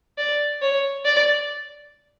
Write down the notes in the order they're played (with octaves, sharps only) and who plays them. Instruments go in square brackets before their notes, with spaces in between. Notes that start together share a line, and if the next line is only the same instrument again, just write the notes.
[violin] D5
C#5
D5